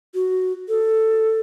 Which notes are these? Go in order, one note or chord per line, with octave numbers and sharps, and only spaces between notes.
F#4
A4